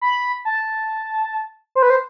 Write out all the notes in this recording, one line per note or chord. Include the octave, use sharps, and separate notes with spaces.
B5
A5
C5
B4
C5